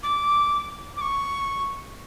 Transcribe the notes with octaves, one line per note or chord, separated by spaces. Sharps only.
D6
D6
C#6